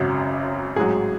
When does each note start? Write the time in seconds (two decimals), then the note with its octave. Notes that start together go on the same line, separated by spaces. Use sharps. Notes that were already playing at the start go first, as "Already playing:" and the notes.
Already playing: G#1 F#2 C#3 F#4
0.76 A1 G#2 F#3 G#4